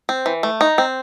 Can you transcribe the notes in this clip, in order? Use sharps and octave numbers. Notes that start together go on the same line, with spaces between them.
C4
E3
A3
D#4
C4